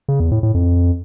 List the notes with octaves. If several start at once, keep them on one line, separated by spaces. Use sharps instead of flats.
C#3
E2
A2
A2
F2